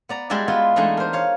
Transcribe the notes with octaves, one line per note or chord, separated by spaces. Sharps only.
B3 D5 A#5
G3 G#3 E4 F#4 D5 E5
B3 E4 F4 G#4 B4
E3 G#3 A3 D4 D#4
A#4 C5
C#5 F5